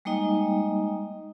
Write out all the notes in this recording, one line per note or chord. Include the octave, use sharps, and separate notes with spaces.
G3 G#3 A#3 D#4 D#5 G5